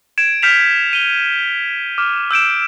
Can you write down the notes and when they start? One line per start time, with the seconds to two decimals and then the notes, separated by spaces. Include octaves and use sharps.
0.18 G#6 D7 E7
0.42 F6 G6 B6 C#7 E7 F7
0.93 D#7 G7
1.98 D6 F6
2.31 E6 G6 D7 E7